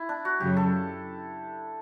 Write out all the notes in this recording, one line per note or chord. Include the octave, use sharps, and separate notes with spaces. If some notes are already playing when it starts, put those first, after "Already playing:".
Already playing: E4
D4
F#4
F#2 C#3 F#3 G4
A4